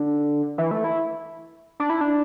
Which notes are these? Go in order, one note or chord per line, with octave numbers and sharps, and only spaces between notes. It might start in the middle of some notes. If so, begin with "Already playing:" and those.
Already playing: D3
E3
A3
E4
D4
E4
D4